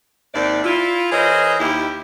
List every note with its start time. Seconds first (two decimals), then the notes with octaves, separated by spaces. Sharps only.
0.34 D#2 C3 D5
0.64 E4 F4
1.12 E3 G#4 A#4 C5 C#5 D#5
1.60 D#2 E4 G4